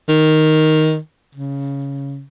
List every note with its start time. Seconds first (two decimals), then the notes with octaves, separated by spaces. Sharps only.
0.09 D#3
1.35 C#3